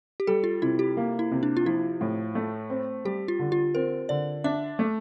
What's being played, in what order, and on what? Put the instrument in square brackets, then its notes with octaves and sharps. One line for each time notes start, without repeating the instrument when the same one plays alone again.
[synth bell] G4
[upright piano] G3 [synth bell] A4
[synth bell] F4
[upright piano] C3 [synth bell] E4
[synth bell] G4
[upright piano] A#3
[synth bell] E4
[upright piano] C3
[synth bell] D4
F4
[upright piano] F3 [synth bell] E4
[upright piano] A2
A3
C4
[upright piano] G3 [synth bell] G4
[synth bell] F4
[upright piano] D3
[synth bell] F4
[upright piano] C4 [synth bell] A#4
[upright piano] D3 [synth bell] D5
[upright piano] D4 [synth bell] E5
[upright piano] A3